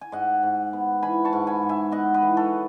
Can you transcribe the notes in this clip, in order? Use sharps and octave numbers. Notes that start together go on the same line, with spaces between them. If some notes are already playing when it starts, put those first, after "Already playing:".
G#5
G#2 D#5 F#5
G#2
B3
E3 G#5 B5
A5 C#6
G#2
G#5 B5
G#2
E5 G#5
B3 D#5 F#5
B4 D#5
E3
A4 C#5